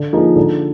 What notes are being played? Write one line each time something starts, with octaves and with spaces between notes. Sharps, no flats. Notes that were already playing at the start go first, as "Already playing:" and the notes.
Already playing: D3
F3 A#3 D#4 G#4
D3